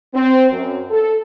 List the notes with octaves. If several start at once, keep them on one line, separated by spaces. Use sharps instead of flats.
C4
F#2
A4